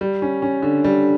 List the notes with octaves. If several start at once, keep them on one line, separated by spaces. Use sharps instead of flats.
G3
C#4
C#4
D3
G3